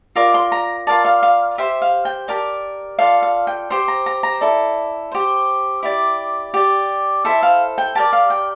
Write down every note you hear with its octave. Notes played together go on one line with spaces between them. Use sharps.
F4 A#4 D5 D6
C6
A#5
F4 A#4 D5 A5
F5
F5
G4 C5 E5
F5
G5
G4 A#4 D5 A5
F4 A4 D5 F5
F5
G5
G4 C5 C6
A#5
A#5
A#5
E4 A4 D5
G4 C5
E4 G4 D5
G4 D5
E4 A4 C5 E5
F5
G5
G4 A#4 D5 A5
F5
G5